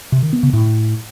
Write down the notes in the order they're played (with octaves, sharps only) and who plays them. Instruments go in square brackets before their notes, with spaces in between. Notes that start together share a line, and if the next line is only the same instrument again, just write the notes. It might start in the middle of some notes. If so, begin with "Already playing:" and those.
[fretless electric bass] C3
D#3
B3
C#3
A2